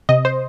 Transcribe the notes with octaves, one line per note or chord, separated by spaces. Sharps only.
C3 D#5
C5